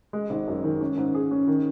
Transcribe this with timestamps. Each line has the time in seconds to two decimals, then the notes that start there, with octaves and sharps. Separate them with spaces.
0.13 G#3
0.30 G#1
0.48 F#2
0.64 D#3
0.81 C#4
0.98 G#2
1.15 G#4
1.31 C#4
1.47 D#3